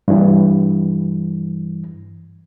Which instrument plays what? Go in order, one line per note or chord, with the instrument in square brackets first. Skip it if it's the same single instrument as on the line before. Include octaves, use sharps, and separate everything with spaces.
[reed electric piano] G2 E3